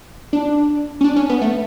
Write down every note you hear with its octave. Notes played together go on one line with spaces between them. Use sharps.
D4
C#4
D4
C#4
B3
A3